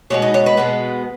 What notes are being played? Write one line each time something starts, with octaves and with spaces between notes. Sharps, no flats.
B2 G#3 B3 C#5
D#4
C#5
B4
B2 G#3 B3